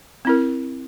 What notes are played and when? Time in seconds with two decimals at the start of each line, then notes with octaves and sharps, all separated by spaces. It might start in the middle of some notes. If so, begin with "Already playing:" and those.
0.25 C4 E4 A#4